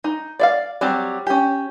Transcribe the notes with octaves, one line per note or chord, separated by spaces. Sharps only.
D#4
D5 E5 F5
F#3 G3 C4 C#5
C#4 G4